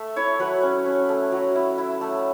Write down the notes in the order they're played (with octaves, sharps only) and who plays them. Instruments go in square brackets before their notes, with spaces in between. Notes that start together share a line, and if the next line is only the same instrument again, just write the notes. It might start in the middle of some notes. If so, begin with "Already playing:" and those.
Already playing: [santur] A3 E5
E4 C#5
F#3 B4
C#4
C#4
A3
F#3
E4
E4
A3